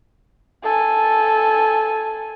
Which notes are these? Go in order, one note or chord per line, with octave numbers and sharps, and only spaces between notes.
A4 G#5